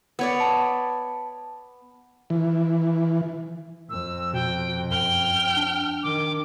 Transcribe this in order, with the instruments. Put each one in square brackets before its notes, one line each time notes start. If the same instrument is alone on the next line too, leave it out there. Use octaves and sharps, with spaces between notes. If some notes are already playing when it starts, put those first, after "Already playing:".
[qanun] B3 C#5 D5
[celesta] A5
[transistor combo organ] E3
[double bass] F2 [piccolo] E6
[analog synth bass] B2 [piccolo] G5
[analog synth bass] F#2 [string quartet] G5 F6 [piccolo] G7
[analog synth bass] D4
[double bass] D#3 [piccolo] D6